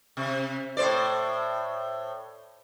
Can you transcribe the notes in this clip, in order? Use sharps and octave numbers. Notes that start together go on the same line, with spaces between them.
C3
A2 C5 D5